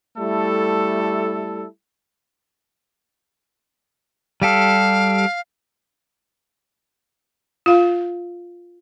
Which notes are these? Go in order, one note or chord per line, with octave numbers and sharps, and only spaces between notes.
G3 A3 E4 A4
G3 G4 A4 F5
F4 F5